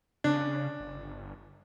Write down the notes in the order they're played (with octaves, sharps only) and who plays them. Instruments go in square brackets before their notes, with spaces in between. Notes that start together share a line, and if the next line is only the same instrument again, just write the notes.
[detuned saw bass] C#3 [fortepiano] D4
[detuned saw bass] G1